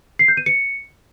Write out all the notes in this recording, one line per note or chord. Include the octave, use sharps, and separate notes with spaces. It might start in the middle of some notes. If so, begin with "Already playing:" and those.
C7
G6
D#7
C#7